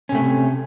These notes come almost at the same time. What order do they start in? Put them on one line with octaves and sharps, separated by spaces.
C#4 C3 A3